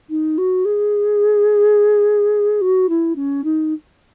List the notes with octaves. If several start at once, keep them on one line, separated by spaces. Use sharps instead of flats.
D#4
F#4
G#4
F#4
E4
C#4
D#4